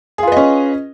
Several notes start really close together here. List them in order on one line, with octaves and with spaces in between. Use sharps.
G#4 F4 B4 D#5 C#4